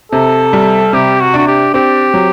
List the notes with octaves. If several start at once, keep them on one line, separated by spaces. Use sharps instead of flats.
C3 A4
G3
C3 G4
F#4
D4 F#4
G4
C4 G4
F#3